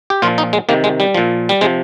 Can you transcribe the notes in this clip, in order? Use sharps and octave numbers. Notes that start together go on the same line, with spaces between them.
G4
A#2 F3 F4
D#4
G#3
C3 D#3 A#3
G#3
G3
A#2 F3
G3
C3 F3 G#3